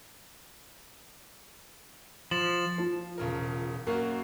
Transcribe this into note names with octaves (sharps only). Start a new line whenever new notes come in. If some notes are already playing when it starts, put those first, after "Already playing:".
F3 A6 E7 F#7
F3
E1 C#3 A#4
F#2 A#3 F#4 A#4